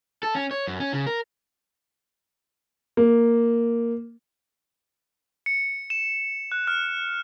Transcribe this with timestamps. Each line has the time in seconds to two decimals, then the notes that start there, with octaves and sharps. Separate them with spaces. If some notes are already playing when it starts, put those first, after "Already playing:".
0.23 A4
0.35 C#4
0.51 C#5
0.67 F#2
0.80 C#4
0.93 C#3
1.07 A#4
2.97 A#3
5.46 C#7
5.90 E7
6.52 F#6
6.67 F6